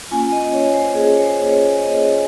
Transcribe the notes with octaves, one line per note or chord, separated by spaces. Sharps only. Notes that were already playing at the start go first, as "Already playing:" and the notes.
A#3 C#4 F4 G#5
D#5
C#5
C5
G#4
C#5
C5
C#5
D#5